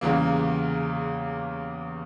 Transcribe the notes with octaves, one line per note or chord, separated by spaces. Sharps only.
E2 C#3 E3 G3 A#3